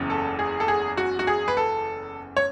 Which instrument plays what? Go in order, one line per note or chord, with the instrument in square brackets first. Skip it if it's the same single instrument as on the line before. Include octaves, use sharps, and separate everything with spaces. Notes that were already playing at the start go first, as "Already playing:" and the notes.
Already playing: [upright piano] F#1 E2 C#3
A4
G#4
A4
G#4
F#4
F#4
G#4
B4
A4
C#5